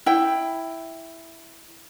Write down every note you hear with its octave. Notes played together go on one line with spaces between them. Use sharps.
E4 G5